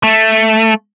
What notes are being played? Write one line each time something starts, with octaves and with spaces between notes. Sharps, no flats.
A3